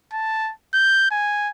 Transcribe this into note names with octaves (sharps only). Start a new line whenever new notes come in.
A5
G6
G#5